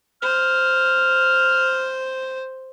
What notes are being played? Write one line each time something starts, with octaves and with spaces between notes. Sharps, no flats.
C5 F6